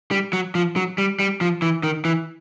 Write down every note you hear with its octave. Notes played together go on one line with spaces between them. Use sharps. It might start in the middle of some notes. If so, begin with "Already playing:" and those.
G3
F#3
F3
F#3
G3
G3
F3
E3
D#3
E3